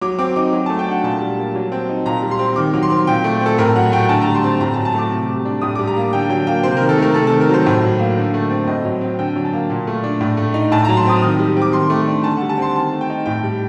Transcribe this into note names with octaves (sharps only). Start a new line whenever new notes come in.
F#3 D6
C4 D6
D#4 D6
F#3
A3 A5
G5
D4 F#5
A#2 A5
G3
A#3
F#3
C4
D#4
A#2 A#5
G3
C6
C4
D#3 D6
F#3
C6
C4
A#2 G5
A3
C4
A4
A2 A#4
F#3 F#5
A3 G5
D3 A5
A#5
G3
C6
C4
A2 A#5
A5
F#3
A5
A3 D6
C3
G3
D4
A2 D#6
G3 D6
A#5
A#3
D3 G5
F#3 G5
A#3 G5
C3 C5
D#3 A#4
A4
A3 A#4
C3 A4
D#3 A4
A#4
F#3 C5
A2
F#3
A#3
D3
A3
C4
A2 D#5
F#3
C4
D3 G5
F#3
A5
A#3
A#2
A3
D4
A2
A3
D#4
A2 A5
F#3 A#5
C6
C4 D#6
D#3 D#6
G3
C4 D6
D#3 C6
A3
D4
D3 A5
G3 F#5
A5
C4 C6
D#3 A5
A3
G5
D#4
A2 G5
G3